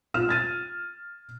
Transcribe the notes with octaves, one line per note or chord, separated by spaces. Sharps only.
F4 F6 E7
G#6 A6 D#7